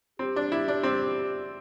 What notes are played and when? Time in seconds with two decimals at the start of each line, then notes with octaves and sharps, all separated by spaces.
0.19 C4 G4
0.36 D4
0.52 E4
0.68 D4
0.83 C4